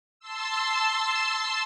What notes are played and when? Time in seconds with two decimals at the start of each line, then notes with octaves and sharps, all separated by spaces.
0.20 A5 C6 E6